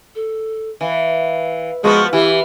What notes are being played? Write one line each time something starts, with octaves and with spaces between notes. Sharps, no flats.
A4
E3 F5
F3 G#3 B3 F#4 C#6
E3 E4 G4